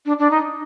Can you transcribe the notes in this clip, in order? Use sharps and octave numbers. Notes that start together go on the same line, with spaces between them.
D4
D4
D#4